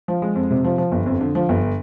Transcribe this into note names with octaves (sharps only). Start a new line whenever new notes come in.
F3
G#3
F2
C3
F3
F3
G1
F2
D3
F3
G1